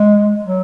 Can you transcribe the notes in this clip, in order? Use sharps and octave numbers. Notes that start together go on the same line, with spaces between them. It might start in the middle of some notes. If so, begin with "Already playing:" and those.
Already playing: G#3
F#3